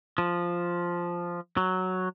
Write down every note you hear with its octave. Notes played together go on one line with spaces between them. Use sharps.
F3
F#3